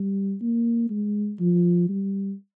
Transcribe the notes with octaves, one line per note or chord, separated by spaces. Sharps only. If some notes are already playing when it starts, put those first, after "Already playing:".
Already playing: G3
A#3
G#3
F3
G3